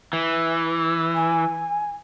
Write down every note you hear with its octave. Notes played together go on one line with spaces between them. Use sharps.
E3
G#5